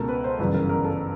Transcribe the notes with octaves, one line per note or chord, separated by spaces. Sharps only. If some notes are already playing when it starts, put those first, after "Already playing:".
Already playing: C#2 B2 A4 A#4
B4
C5
G1 F#2 C#3 E3 B4
A#4
A#4
A4